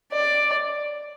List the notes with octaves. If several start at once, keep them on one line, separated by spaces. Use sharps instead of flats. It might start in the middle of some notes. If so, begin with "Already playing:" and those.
D5